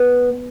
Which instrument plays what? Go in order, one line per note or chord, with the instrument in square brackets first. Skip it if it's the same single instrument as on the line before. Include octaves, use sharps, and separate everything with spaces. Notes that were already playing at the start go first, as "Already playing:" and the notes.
Already playing: [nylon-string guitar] B3